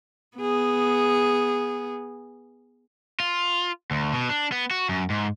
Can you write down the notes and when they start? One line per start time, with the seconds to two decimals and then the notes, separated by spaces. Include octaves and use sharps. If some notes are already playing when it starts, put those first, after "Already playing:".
0.37 B3 G#4
3.20 F4
3.91 D2
4.14 B2
4.29 D4
4.52 B3
4.71 F#4
4.89 F#2
5.10 G#2